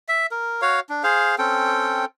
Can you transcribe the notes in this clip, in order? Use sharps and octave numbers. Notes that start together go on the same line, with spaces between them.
E5
A#4
F#4 C#5 F5
D4
G#4 C5 F5
C4 C#4 A4 G5